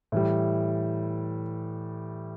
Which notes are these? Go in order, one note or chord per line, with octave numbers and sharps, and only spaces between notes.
A2 E3 G3